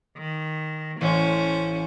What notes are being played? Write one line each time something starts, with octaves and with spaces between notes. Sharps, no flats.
D#3
A1 A3 C#4 C5